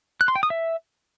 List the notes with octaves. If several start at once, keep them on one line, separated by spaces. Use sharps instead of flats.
F#6
C6
G5
D#6
E5